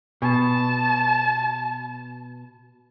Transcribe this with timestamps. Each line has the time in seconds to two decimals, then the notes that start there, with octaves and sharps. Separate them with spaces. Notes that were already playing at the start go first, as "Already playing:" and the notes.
0.22 B2 A5